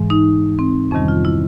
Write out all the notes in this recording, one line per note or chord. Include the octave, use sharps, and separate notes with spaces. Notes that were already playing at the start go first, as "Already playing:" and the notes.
Already playing: G#2 E3 G#3
D#4
C4
F2 C3 D#3 G3 C#4
F4
E4